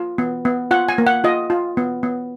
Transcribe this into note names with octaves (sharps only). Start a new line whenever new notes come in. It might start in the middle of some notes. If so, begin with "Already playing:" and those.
Already playing: F4
B3
B3
F4 F#5
G#5
A#3
F#5
F4 D#5
F4
B3
B3